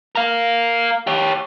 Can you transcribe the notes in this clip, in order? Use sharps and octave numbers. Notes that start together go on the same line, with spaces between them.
A#4 F5
G4 C#5